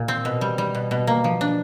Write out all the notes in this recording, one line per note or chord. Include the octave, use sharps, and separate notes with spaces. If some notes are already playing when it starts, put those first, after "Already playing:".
Already playing: A#2
C4
B2
G3
G3
B2
B2
A#3
F3
D4